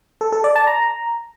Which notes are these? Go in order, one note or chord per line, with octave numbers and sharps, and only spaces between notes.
A4
A4
D5
A5
A#5